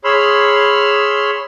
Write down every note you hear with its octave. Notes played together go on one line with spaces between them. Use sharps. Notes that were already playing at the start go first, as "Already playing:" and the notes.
G#4 C#5 B5 C6 E6 F6